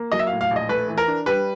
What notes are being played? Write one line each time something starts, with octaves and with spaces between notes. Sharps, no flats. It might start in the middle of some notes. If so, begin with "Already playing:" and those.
Already playing: A#3
F#3 D#5
E5
F5
A2
F5
A#1
D#5
A3 B4
E3
A#4
D4
G3 B4